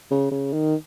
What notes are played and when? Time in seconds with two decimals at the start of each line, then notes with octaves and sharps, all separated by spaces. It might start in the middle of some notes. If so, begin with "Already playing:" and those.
0.11 C#3
0.32 C#3
0.53 D#3